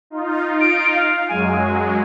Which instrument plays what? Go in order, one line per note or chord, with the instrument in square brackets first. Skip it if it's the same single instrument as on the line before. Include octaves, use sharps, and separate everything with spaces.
[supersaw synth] D#4 F4
[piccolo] D7
F5
[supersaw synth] F#2 F#3 G#3 [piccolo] G#5